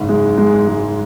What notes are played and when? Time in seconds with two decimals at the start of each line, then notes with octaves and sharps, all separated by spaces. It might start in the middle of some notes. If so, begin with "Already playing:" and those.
Already playing: F#1 G#2
0.09 G#3
0.38 G#3
0.67 G#3